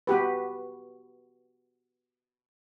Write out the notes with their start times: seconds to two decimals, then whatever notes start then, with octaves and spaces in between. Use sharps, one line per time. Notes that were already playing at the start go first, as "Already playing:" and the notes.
0.07 B3 F#4 G4 B4